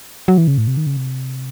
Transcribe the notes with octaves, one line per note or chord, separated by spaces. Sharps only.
F#3
E3
C#3
A2
C3
D#3
C#3
C3